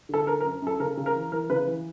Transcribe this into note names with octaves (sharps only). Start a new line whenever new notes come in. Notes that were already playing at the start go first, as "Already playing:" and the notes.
D3 A4
D3 A#4
A#4
F#2
F#2 A4
C#3 A#4
C#3
A#4
E3
E3 A#4
C#3 B4
E3